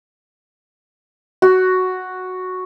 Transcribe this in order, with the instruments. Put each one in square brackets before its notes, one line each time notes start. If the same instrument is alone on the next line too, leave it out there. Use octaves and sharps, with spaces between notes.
[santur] F#4